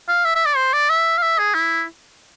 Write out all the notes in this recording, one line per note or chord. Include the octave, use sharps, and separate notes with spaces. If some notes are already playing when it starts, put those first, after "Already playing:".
F5
E5
E5
D5
C5
D5
E5
F5
E5
G#4
E4